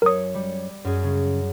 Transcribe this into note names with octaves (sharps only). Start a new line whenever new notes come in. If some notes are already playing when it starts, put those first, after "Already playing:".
F#2 A#4 C#5 D#6
G3
F#2 G#4
C#3